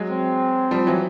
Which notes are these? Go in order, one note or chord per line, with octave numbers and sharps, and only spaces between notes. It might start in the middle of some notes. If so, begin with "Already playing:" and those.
Already playing: F#3 G#3
C4
F3 G3
E3 F#3